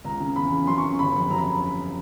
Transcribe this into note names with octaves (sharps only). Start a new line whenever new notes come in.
C#2 A#5
C#3
E2 B5
C#3
F#2 C6
C#6
C#3
G1 B5
F2
F#2 A#5
B5